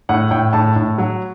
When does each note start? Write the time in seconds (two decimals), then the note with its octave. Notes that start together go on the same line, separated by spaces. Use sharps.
0.09 A2 F#5
0.31 A2 G5
0.53 A2 A5
0.76 A2
0.98 F#3